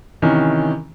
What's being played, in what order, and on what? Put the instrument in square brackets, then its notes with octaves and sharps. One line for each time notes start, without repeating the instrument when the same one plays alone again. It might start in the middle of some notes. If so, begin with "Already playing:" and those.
[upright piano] C3 D#3 E3 C#4